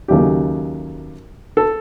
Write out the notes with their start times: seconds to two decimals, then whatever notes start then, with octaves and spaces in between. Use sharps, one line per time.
0.08 D#2 C#3 F#3 A3 G4
1.57 A4